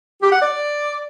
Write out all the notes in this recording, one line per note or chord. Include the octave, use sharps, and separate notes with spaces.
G4
F#5
D5